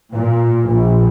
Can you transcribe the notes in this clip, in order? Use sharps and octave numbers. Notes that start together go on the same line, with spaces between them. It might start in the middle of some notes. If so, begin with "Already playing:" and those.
A#2
A#1